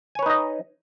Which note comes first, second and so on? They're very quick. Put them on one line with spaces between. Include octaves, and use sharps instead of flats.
G#5 C#5 B4 D#4 D#5